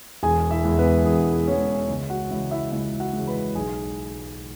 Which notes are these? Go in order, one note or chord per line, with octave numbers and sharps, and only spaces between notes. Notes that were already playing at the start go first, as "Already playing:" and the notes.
E1 G#4 G#5
E4 E5
E2 E3 G#3
B3 B4
E1 G#4
E2 E3 G#3 C#4 C#5
C#2
F#4 F#5
C#3 E3 G#3 E4 E5
E4 E5
C#2 E4 E5
F#4 F#5
C#3 E3 G#3
B4 B5
B1 G#4 G#5